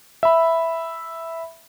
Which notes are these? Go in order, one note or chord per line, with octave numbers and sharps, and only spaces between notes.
E5 B5